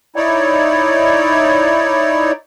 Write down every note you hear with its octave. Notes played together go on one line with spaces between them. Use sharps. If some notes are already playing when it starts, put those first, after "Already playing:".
D#4 E4 C#5 D5